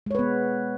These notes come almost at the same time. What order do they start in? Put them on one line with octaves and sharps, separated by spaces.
G#3 C#5 B4 B3